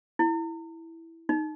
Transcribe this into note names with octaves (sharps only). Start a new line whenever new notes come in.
E4
D#4